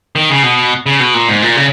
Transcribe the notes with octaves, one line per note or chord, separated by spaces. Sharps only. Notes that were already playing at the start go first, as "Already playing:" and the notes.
D#3
C#3
B2
C#3
B2
A#2
G#2
A#2
C#3